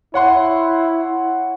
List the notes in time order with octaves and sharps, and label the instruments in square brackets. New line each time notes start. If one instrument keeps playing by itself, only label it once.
[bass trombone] E4 [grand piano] C#5 F#5 C6